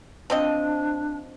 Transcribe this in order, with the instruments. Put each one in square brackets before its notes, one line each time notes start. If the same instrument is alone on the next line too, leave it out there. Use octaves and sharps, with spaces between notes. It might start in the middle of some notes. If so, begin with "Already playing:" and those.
[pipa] F3 C4 D#5 [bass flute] D4